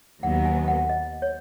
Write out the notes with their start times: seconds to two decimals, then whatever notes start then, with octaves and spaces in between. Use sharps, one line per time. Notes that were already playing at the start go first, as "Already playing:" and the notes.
0.23 D#2 D#3 F#3 B3 F#5
0.45 G#5
0.68 F#5
0.89 D#5
1.22 C#5